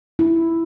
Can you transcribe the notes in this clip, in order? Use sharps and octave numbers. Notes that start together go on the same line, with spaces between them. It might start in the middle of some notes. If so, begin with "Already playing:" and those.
E4